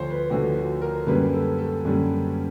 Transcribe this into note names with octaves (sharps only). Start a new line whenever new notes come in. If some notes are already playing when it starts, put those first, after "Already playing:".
Already playing: D2 D3 F3 C5 C#5
B4
D2 D3 F3 F#4
F#4
A#4
F#2 D3 G3 A#3 C#4 B4
A4
A4
F#2 D3 G3 A#3 C#4